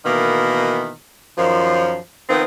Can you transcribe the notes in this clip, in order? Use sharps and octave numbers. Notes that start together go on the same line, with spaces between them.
B2 D#3 E3 A#3 B3
F#2 D#3 F3
D#3 F3 B3 C4 D#4